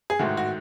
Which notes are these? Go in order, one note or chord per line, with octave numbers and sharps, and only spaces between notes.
G#4
A1 G#2 D#3 A3 F#4
F#4